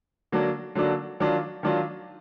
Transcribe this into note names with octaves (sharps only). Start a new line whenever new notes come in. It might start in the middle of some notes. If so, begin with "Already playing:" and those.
D3 F#3 A#3 D4 F#4
D3 F#3 A#3 D4 F#4
D#3 F#3 D4 F4
D#3 F#3 D4 F4